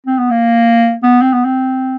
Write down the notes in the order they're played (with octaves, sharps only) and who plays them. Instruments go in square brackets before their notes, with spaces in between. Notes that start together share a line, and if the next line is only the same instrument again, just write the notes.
[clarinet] C4
B3
A#3
B3
C4
B3
C4